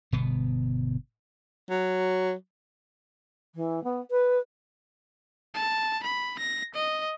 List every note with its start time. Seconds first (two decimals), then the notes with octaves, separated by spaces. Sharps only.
0.12 G1 B2 B3
1.70 F#3
3.55 E3
3.84 B3
4.11 B4
5.54 A5
6.03 B5
6.39 A#6
6.74 D#5